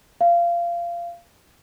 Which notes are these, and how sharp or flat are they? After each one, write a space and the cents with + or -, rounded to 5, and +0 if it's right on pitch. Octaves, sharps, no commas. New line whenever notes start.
F5 -20